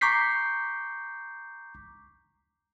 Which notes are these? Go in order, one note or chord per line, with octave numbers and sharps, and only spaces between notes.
A#5 C#6 D6 G6 B6 C7